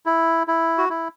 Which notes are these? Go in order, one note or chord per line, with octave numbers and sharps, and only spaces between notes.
E4
E4
F#4
E4